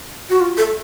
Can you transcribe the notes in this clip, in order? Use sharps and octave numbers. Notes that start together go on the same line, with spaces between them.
F#4
F4
A4